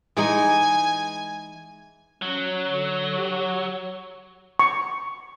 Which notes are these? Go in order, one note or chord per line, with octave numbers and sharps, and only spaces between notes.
E3 G#3 D#4 G#5
F#3 C#4
D3
G4
C#5
C#6